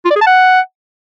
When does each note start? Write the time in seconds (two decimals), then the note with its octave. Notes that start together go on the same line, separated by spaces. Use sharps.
0.05 F4
0.10 D5
0.16 G#4
0.21 A5
0.26 F#5